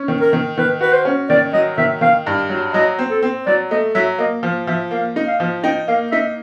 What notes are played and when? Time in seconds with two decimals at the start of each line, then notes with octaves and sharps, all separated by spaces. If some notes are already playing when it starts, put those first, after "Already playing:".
Already playing: C#4
0.08 D#3
0.21 A#4
0.33 D#3
0.57 D#3 B4
0.81 F#4 B4
0.93 C5
1.05 C#4
1.29 D#3 D5
1.53 F#3 D#5
1.78 D#3 E5
2.01 D#3 F5
2.26 G2
2.49 F#3
2.74 F#3 D#5
2.99 C4
3.10 A4
3.23 C4
3.46 F#3 D5
3.71 A3 D#5
3.95 F#3 E5
4.18 A#3 D#5
4.43 F3
4.67 F3 E5
4.91 A#3 F5
5.16 D#4
5.27 F5
5.40 F3
5.64 D#4 G5
5.88 A#3 F5
6.12 D#4 E5